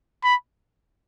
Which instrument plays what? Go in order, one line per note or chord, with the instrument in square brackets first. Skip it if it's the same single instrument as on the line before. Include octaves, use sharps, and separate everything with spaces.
[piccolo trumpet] B5